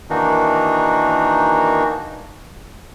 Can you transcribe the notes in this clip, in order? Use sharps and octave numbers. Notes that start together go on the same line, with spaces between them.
D#3 E3 A#3 D4 D#4 F#4